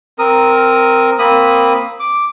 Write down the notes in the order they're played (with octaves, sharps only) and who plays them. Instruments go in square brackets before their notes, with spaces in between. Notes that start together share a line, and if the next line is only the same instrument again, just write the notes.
[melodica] C4 A#4 D#6
A#3 C4 B5 D#6
D6